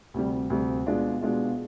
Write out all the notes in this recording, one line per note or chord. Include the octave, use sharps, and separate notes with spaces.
D2 C3 G3
D2 C3 G3
B2 G#3 D4 F4
B2 G#3 D4 F4